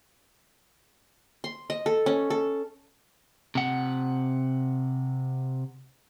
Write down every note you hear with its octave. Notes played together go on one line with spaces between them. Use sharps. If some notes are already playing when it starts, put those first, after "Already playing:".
C6
D#5
A4
C#4
A4
C3 F#5